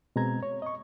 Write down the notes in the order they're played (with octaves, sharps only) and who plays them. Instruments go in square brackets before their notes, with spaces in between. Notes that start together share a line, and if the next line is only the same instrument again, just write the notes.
[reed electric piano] B2 G#3 C4 A#5 G#6
C#5
D#5 C#6